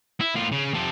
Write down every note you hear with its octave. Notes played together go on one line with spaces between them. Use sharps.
E4
A2 F4
C#3
C3 A4